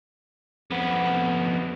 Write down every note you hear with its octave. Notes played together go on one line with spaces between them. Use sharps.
F2 B3